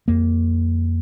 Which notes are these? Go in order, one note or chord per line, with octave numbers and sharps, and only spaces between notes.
F2 A#3